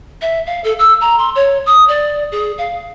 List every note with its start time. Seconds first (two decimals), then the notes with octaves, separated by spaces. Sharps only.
0.21 E5
0.47 F5
0.64 A4
0.79 E6
1.01 A#5
1.18 C6
1.35 C#5
1.66 D#6
1.88 D5
2.32 G#4
2.58 F5